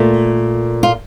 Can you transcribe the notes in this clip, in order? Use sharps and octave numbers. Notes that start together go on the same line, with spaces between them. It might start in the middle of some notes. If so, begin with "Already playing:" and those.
Already playing: A#2 A3
F4